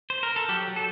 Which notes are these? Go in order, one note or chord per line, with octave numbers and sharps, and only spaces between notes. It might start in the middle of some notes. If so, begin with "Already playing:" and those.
C5
A#4
A4
F#3 G4
F#3
A4